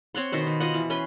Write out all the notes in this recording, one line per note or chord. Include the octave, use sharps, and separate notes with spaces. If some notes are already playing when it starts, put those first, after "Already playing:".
C4 C#5 F#5 C6
B2 D#3 B3 C5
D#3
F4 D#5 F#5
E3
C#4 B4 G#5 C6